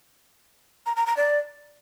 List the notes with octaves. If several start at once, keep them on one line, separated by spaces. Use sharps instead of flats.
A#5
A#5
A#5
D5